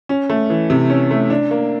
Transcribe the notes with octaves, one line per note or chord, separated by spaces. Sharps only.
C#4
A3
E3
C3
C#4
A3
D4
A#3